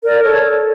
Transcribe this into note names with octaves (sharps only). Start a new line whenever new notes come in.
A#4 D5
A4 C#5